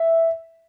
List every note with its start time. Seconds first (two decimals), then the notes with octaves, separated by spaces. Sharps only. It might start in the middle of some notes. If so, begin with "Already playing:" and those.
Already playing: E5